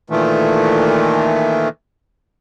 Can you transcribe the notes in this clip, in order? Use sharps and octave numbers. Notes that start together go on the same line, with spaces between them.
A#2 D#3 E3 A3